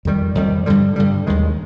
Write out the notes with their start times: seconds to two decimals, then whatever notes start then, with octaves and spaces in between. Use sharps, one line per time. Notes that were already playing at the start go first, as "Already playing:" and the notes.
0.05 F2 D#3 G3
0.35 F2 D#3 G3
0.66 G2 D3 G3
0.96 G2 D3 G3
1.27 D#2 D#3 G#3